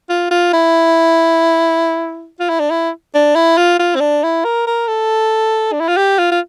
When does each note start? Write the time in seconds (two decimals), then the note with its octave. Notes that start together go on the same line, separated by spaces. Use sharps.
0.09 F4
0.31 F4
0.53 E4
2.40 F4
2.49 E4
2.60 D4
2.70 E4
3.14 D4
3.35 E4
3.57 F4
3.79 F4
3.95 C4
4.00 D4
4.23 E4
4.44 A#4
4.67 A#4
4.87 A4
5.72 D4
5.80 E4
5.88 F4
5.97 G4
6.19 F4
6.32 F4